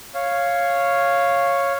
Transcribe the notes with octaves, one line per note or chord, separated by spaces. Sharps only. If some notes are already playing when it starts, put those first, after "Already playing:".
C#5 F5